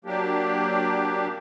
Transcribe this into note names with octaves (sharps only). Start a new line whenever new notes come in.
F#3 A#3 D4 G4